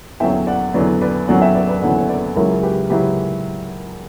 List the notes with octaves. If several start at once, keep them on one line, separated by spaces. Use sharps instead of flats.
E2 D3 F#3 C#4 E5 G5
D5 F#5
E2 D3 F#3 C#4 B4 D5
B4 D5
E2 D3 F#3 C#4 D5 F#5
E5 G5
B4 D5
B4 D5
E2 D3 F#3 C#4 D5 F#5
C#5
B4 D5
C#2 C#3 F#3 C#4 E4 A#4 C#5
G4 B4
C#3 F#3 C#4 E4 G4 B4